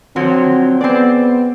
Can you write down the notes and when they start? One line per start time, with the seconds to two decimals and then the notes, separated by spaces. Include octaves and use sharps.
0.16 D3 F3 F#3 C4
0.81 B3 C4 G#4 D5